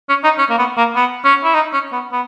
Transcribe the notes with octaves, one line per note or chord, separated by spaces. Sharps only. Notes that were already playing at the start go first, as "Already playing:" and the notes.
C#4
D#4
C#4
A#3
B3
A#3
B3
C#4
E4
D#4
C#4
B3
B3